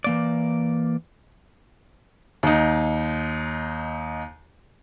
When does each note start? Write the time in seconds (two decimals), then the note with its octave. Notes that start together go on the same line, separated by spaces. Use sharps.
0.04 E3 A#3 D5
2.43 D#2 D#4